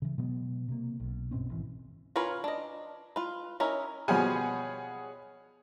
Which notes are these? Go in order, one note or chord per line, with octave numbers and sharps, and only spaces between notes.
C#3 E3
B2 F#3 G#3 B3
C3 A#3
B1
G2 B2 C4 C#4
G#1 E3
C#4 F4 A#4 B4 C#5
D4 D#5
F4 B4
C#4 D#4 E4 A#4
B2 F3 G3 G#4 C#5 F#5 G#5 B5